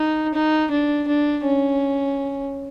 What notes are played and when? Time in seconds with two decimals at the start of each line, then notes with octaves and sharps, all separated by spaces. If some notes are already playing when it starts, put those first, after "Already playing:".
Already playing: D#4
0.35 D#4
0.71 D4
1.08 D4
1.44 C#4